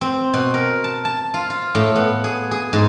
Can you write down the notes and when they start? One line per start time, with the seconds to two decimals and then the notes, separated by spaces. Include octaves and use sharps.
0.01 C4
0.33 B2
0.54 A#4
0.84 A5
1.05 A5
1.34 F4
1.50 F4
1.75 A2
1.95 B3
2.24 G#4
2.51 G#4
2.73 G#2